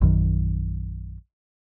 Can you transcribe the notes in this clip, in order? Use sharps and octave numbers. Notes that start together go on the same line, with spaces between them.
A#1 F#2 D#3